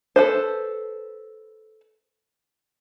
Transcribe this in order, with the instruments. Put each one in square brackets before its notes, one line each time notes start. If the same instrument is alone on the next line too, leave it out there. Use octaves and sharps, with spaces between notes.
[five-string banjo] A4 B4 C5